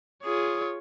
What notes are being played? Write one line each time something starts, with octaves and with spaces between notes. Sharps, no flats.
F4 G#4 C#5 D#6